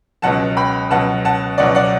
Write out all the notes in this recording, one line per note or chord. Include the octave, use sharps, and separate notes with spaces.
C#2 B2 F#3 F#5 A5
G5 B5
C#2 B2 F#3 F#5 A5
F#5 A5
C#2 B2 F#3 D5 F#5
D5 F#5